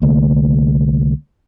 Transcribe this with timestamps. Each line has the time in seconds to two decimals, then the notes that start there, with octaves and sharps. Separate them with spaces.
0.02 C2 D3 A3 A#3